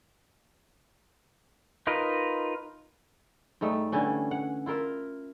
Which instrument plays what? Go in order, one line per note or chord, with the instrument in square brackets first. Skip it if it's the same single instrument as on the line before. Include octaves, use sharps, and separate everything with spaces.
[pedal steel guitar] D#4 F4 A#4 B4 D#5
[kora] G#2 G3 A3 D#4
D3 E3 G3 C#4
F#5
E4 F4 A#4 E5